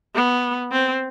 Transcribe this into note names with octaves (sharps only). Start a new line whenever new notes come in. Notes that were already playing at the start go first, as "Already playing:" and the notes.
B3
C4